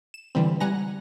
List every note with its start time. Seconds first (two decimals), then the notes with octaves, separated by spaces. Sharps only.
0.14 E7
0.35 D3 E3 G3 C4
0.60 G3 F#5 G#5 A#5 A#6